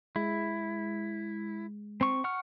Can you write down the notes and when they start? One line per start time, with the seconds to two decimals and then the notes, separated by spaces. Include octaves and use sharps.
0.16 G#3 E4
2.01 C4 C#6
2.24 F#5 C#6 F6